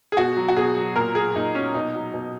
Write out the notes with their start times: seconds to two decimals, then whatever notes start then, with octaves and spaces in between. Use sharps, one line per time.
0.12 G#4
0.17 B2 F#4
0.37 F#3
0.48 F#4
0.57 B2 G#4
0.77 F#3
0.96 A#2 A#4
1.15 F#3 G#4
1.35 A#2 D#4
1.54 F#3 C#4
1.74 B2 D#4
1.94 F#3
2.14 B2